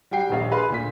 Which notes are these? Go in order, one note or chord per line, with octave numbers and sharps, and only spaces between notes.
G3 F#4 G5 C7
D#1 A#1 F5
G#4 B4 F5 B5 C6
D2 A#2 B6